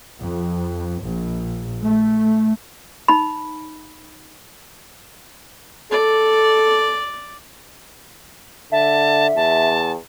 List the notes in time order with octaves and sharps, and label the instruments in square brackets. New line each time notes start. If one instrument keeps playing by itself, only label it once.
[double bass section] F2
A#1
A3
[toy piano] D#4 B5
[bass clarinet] A4 [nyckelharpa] D5
[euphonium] D3 [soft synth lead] E5 [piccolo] A5
[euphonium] E2 [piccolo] A5